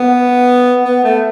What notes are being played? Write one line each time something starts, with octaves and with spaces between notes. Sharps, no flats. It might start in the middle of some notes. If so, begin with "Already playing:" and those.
Already playing: B3
B3
A3